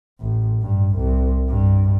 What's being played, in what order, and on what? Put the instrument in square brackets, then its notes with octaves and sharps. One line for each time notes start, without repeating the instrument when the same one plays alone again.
[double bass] A1
G2
C2
G2